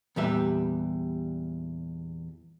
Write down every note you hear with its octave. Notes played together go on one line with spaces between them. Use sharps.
E2 A#2 G3 G4 B4 E5